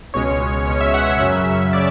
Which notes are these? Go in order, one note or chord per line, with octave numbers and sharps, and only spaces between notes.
C#2 B2 G#3 C#4 C#5
C#2 B2 G#3 C#4 C#5
E5
F#5
E5
F#2 C#3 F#3 C#4 E5
C#3 D5